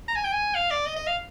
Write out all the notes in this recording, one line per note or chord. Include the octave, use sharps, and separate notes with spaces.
A#5
G#5
G5
G#5
F5
D5
D#5
D#5
F5